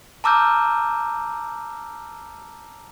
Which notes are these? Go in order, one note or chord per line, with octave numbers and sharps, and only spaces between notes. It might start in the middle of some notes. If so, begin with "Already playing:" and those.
A5 A#5 D6 E6 F6 G6